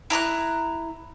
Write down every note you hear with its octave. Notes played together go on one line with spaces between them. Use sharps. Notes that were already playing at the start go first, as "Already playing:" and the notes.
E4 A#5 D6 F#6